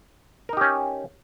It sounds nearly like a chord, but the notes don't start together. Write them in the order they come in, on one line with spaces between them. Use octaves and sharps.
A#4 D#4 G4 C#4